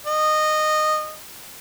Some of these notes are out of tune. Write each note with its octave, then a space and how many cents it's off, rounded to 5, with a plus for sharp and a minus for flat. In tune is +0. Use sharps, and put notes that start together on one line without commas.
D#5 -15